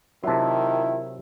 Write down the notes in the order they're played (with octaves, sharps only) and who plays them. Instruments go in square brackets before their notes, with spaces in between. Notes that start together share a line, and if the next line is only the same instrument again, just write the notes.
[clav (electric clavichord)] C3 F#3 [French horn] D#3 [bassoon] E4 [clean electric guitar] F4 A5